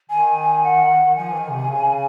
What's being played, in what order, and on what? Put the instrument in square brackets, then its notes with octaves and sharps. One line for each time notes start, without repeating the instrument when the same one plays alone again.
[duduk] D#3 [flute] G#5
[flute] F#5
[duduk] F3 [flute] G#5
[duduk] D#3
C3
C#3